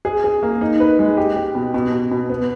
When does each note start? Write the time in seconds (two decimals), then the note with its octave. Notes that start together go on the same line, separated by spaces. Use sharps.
0.05 G#4
0.24 G#4
0.43 A#3
0.61 D#4
0.80 B4
0.99 G#3
1.17 G4
1.36 G4
1.55 B2
1.74 B2
1.92 B2
2.11 B2
2.29 B3